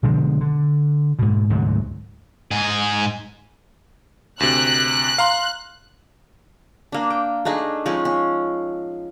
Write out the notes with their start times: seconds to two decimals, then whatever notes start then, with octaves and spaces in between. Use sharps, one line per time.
0.03 B2 D3 F3 G#3
0.41 D3
1.19 G#2 B2
1.50 D2 G#2 C3 F#3
2.51 G#2 G#4
4.40 D2 C3 F#6
5.18 F5 A#5 C6
6.92 A#3 D4
7.10 G5
7.45 A3 D4 D#4 G#4
7.86 F3 G#3 C#4 D#4
8.05 C#4